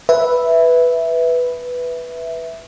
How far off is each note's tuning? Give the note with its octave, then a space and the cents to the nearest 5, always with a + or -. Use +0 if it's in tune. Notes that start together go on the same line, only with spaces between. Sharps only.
B4 +0 E5 -5